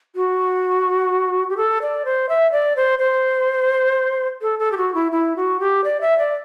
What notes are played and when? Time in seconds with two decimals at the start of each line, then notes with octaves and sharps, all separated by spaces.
0.16 F#4
1.50 G4
1.57 A4
1.82 D5
2.05 C5
2.29 E5
2.52 D5
2.76 C5
2.99 C5
4.42 A4
4.59 A4
4.72 G4
4.77 F#4
4.94 E4
5.12 E4
5.36 F#4
5.60 G4
5.84 D5
6.01 E5
6.18 D5